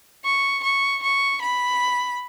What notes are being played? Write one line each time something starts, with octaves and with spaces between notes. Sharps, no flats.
C#6
C#6
C#6
B5